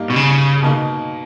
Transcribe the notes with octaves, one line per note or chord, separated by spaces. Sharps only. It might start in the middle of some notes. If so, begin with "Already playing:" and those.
Already playing: G2 G3 A#3 D#4
B2
C#3
B2 A#3 D#4